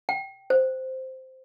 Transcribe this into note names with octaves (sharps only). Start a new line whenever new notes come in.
G5
C5